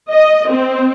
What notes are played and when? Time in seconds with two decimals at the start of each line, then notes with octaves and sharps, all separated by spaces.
0.10 D#5
0.49 C4